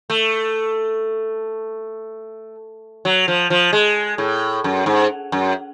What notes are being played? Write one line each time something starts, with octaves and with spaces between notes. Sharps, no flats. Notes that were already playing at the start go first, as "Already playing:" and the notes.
A3
F#3
F3
F3
G#3
A2
F#2
G#2
F#2